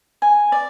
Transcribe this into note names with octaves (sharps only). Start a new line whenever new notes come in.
G#5
D5